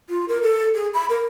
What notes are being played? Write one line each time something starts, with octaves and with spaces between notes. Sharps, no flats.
F4
A#4
A4
G#4
B5
A#4